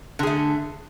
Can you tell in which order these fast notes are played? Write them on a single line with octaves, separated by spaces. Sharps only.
D3 G#4 A3